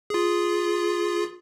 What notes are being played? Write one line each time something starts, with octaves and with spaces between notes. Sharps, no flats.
F4 G#4